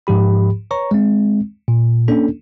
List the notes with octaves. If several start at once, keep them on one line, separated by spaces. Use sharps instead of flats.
G#2 F3 G4 B5
B4 C#5 A#5 C#6
G#3 C4
A#2
A#3 C#4 D4 A4